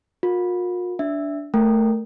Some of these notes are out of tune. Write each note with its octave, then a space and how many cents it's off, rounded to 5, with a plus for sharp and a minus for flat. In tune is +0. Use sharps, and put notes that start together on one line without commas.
F4 +45 A#4 +0
D4 -15 E5 +0
A3 +0 A#4 -5 G5 +0